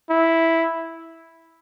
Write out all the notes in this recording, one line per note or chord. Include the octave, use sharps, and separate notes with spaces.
E4